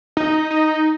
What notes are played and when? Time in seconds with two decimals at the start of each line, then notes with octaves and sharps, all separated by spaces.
0.17 D#4
0.51 D#4